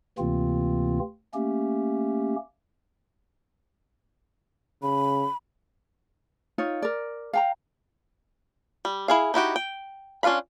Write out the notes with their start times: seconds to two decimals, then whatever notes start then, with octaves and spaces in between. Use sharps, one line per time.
0.18 D2 C3 E3 A#3 C4 F4
1.34 A3 A#3 C#4 G4
4.83 C#3 B5
6.58 D#4 F4 C#5
6.82 A#4 D5
7.33 F5 G5 A#5
8.85 G3
9.08 E4 G#4 F5
9.34 D#4 E4 F#4 G4
9.56 G5
10.23 C#4 D4 F4 F5 B5